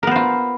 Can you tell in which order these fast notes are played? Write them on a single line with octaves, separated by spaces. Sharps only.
A#4 B3 C5 F4